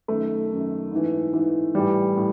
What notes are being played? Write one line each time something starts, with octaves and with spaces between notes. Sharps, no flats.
F#2 D#3 A3
F#2 D#3
G#2 E3
G#2 E3
A2 E3 G3
A2